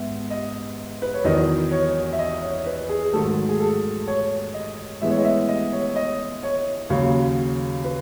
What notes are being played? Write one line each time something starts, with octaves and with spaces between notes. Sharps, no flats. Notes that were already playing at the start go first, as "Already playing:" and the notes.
Already playing: G#2 B3 E5
D#5
B4
C#5
E2 D#3 F#3 D#5
C#5
E5
D#5
C#5
B4
G#4
G#2 D#3 F#3 A3 A4
G#4
A4
C#5
D#5
A2 E3 G#3 B3 E5
C#5
D#5
E5
D#5
C#5
C#5
D#5
C#5
D#2 C#3 F#3 C#5
B4